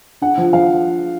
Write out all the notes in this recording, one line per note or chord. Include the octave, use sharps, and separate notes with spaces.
D4 F#5
F3
F3 F5